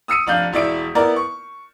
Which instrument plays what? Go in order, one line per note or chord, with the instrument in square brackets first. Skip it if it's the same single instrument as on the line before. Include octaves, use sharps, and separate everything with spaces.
[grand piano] D#6 E6 C#7 D#7
F1 D4 F5 G6
E1 E4 D5 E5 D7
B3 E4 A#4 D5
C#6